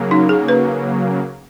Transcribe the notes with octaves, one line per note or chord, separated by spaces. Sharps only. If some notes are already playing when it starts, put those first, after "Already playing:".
Already playing: C#3 F#3 A#3
D#4
G#4
B4